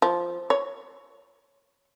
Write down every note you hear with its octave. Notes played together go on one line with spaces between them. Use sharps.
F3
C#5